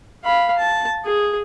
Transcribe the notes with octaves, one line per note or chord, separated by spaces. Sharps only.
F5 B5
A5
G#4